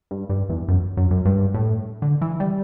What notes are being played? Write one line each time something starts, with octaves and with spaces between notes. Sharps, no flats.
G2
G2
E2
F#2
F#2
F#2
G2
A2
D3
E3
G3